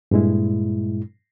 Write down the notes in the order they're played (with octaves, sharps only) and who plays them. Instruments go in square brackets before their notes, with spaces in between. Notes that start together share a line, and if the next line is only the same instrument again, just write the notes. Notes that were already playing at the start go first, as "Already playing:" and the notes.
[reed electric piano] G2 A#2 G#3 E4